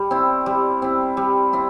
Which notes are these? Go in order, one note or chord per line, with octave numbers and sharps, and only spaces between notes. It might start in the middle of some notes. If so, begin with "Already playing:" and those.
Already playing: G3
C4 E4
G3
C4 E4
G3
C4 E4